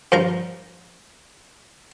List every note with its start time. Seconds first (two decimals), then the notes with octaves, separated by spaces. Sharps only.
0.12 G2 F3 A#4 A#5